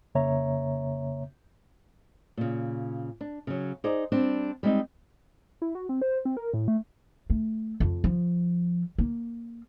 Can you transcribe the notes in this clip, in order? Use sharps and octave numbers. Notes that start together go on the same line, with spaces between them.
F2 C#3 A#3 C#5 E5 A#5
A#2 C#3
D4
C#3 F#3
D#4 G#4 C5 D5
G3 C4 D4
G3 G#3 C4 D#4
E4
F#4
C4
C5
C4
A#4
A2
A3
A3
F2
F3
A#3